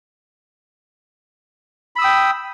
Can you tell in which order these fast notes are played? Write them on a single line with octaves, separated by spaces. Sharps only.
B5 E6 D#6 G5